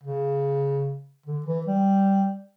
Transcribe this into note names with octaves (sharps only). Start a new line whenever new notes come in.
C#3
D3
E3
G3